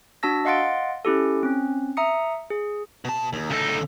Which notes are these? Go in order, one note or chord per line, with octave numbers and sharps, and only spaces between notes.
D4 F#4 A5 E6 A#6
D#5 F5 F#5 C6 A6 D7
C#4 E4 G4 A4
C4 C#4
E5 A#5 D#6 C#7
G#4
B2 A5
D#2
D2 C#3 D#4 A4